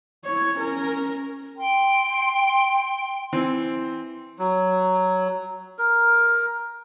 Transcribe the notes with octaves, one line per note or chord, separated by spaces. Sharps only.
E4 C#5
C#4 A#4
G5 C6
E3 C4
F#3
A#4